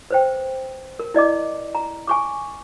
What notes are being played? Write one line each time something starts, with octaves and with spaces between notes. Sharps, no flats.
B4 C5 G5
A#4
E4 D5 D#5 D6
A#5
G#5 C#6 D6